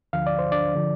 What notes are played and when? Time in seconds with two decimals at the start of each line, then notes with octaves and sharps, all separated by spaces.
0.13 D2 D3 F3 F5
0.27 D5
0.39 C5
0.52 D4 D5
0.75 D3 F3